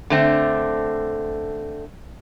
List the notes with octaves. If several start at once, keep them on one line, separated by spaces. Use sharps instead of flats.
D3 A3 C4